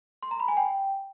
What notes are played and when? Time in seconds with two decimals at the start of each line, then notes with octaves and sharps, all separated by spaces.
0.22 C6
0.31 A#5
0.40 B5
0.48 G#5
0.57 G5